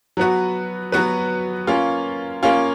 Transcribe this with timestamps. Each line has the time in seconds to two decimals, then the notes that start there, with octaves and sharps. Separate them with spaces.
0.17 F#3 B3 F#4 B4
0.92 F#3 B3 F#4 B4
1.67 A#3 C#4 F4
2.43 A#3 C#4 F4